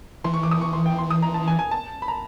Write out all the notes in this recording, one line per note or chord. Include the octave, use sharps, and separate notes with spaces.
E3 C6
C#6
D6
D#6
C#6
C6
G5
C6
D#6
A#5
A5
G#5
G#5
A5
B5
A#5